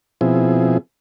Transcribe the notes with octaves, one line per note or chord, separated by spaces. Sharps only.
B2 F3 C4 E4 G#4